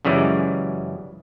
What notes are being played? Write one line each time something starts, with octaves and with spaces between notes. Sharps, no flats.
F#2 C#3 E3 G3 G#3